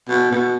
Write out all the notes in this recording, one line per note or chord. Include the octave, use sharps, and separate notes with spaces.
B2
B2